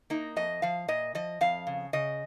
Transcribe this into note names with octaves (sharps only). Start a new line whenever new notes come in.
A#3 D#4
F2 D#5
F3 F5
A#2 D#5
F3 D#5
F2 F5
C#3
C#3 D#5